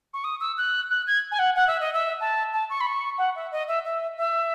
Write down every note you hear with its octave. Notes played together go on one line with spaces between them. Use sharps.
C#6
D#6
E6
F#6
F#6
G#6
G#5
F#5
F#5
E5
D#5
E5
A5
A5
C#6
B5
C#6
F#5
E5
D#5
E5
E5
E5